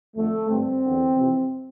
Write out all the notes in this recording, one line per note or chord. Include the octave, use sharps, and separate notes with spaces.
F2 D3 A3
G2 D3 C4
E2 D3
F2 C3 E3